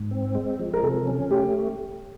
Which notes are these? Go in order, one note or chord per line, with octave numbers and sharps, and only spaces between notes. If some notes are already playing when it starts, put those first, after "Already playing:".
Already playing: G#2
C4
G#3
F3
A#4
C3 A4
C#4
A3 G4